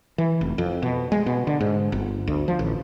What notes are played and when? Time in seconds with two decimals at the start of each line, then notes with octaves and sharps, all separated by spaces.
0.18 E3
0.41 F1
0.58 F2
0.83 B2
1.12 G#3
1.26 B2
1.47 D3
1.61 G#2
1.92 G1
2.28 D2
2.48 F3
2.59 A1